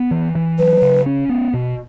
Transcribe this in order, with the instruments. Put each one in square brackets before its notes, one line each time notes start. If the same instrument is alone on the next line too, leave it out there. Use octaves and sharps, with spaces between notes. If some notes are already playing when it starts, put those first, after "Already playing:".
Already playing: [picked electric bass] B3
E3
E3
[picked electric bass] F#3 [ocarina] B4
[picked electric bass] C#3
C#4
B3
B2